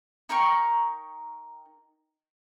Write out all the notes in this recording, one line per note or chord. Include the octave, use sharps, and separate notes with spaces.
D#4 A#4 G5 C#6